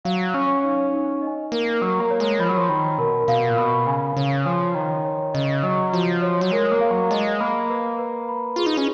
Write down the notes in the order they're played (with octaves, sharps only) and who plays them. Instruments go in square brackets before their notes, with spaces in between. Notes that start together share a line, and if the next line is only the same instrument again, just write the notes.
[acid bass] F#3 [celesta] F5
[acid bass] C#4 [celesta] C#5
[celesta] D#4
D#4
D#5
[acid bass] A#3 [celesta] A#4
[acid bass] F#3 [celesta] A#4
[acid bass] A#3
[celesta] C#5
[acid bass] G#3
[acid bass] F3 [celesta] B5
[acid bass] F#3
F3
[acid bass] D#3 [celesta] B5
[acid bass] B2 [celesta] A#4
[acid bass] B2 [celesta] F5
[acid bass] A#2
[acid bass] B2 [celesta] B5
[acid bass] C#3 [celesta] G#5
[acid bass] C#3 [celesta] C#5
[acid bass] F3 [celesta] G#5
[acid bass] D#3 [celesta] C#5
[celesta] C#5
[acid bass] C#3 [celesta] D#5
[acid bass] F#3 [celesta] D#5
[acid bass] F3 [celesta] F#4
[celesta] C#5
[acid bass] F#3
[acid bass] G#3 [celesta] A#4
[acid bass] A#3
[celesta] F5
[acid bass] F#3
[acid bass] G#3 [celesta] D#5
[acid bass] A#3 [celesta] B5
[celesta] B4
B4
B5
[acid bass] F4 [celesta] G#4
[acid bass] D#4
C#4